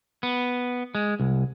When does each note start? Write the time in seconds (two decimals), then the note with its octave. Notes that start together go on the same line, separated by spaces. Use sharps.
0.23 B3
0.95 G#3
1.20 C2